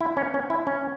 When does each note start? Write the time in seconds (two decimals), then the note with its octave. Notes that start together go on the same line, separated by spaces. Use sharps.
0.01 E4
0.17 C#4
0.34 C#4
0.50 E4
0.67 C#4